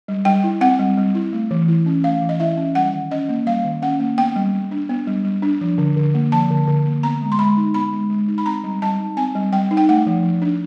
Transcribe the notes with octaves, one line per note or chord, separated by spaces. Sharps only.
G3
G3 G5
E4
C4 F#5
G3
G3
E4
A3
E3
E4
C#4
A3 F5
E3
D#5
E4 E5
C#4
G3 F#5
D#3
C#4 D#5
A#3
G3 F5
D#3
C#4 F#5
A#3
B3 G5
G3
G3
D4
B3
G3
G3
D4
F3
D3
D3
A#3
F3 A5
D3
D3
A#3
B3 A#5
G#3
C6
G#3 B5
D#4
B3 B5
G#3
G#3
D#4
B5
C4 A#5
G3
G3 A5
D#4
C4 G#5
G3
G3 G5
D#4
G5
A3 F#5
F3
F3
D4